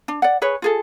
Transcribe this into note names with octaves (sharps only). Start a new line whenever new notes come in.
D4
D5 F#5
G#4 B4 C#5
F4 G#4 A4